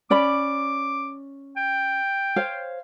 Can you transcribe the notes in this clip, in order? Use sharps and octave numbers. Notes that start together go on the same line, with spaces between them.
C#4 D5 B5 D6
G5
C5 C#5 F5